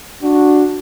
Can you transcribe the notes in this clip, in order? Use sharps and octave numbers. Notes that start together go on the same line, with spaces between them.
D4 F#4